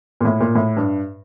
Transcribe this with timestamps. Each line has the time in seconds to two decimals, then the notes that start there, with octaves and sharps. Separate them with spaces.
0.21 A#2
0.25 A2
0.40 A#2
0.55 A2
0.76 G2